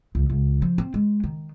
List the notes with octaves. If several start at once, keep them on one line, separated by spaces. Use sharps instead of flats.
C#2
C#2
F3
C4
G#3
D#3